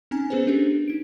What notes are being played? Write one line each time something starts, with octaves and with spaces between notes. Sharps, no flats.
C4 C#4 D#4 G#5 A#5
B3 C#4 G#4 B4 C5
C#4 D4 G4 A4 A#4
D#4 D7